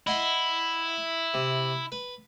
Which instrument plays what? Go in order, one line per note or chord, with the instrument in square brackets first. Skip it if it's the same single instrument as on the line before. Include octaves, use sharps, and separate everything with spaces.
[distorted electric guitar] E4 [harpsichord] D#5 F#5 C6
[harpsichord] C3
B4